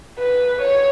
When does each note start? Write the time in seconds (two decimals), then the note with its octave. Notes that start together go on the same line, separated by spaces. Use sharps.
0.19 B4
0.61 C#5